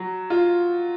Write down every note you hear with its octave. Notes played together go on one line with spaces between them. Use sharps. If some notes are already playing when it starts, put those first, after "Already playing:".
Already playing: F#3
F4